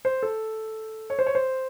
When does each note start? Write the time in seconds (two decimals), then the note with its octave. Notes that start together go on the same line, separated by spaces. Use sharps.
0.05 C5
0.23 A4
1.10 C#5
1.19 C5
1.26 C#5
1.35 C5